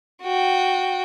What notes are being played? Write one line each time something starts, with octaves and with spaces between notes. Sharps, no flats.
F#4 G5